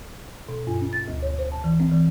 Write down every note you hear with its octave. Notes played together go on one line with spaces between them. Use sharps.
B2
G2
C#4
A6
D2
C#5
C5
A5
E3
C4
E3